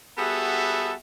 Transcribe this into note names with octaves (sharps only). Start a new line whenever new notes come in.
G3 B3 F#4 G#4 A4 E5